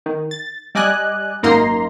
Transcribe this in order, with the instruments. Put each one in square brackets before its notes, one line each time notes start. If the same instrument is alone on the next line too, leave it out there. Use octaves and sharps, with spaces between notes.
[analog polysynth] D#3
A6
G3 D5 D#5 G#5 F#6
G#1 F#2 A#3 D#4 A#5 C6